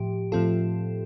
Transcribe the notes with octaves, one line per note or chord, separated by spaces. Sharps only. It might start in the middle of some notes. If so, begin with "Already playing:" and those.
Already playing: A2 F3 G4
A2 F3 C4 F4 A4